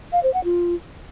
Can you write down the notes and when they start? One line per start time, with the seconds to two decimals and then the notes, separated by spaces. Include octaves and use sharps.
0.12 F5
0.23 C5
0.34 F#5
0.44 F4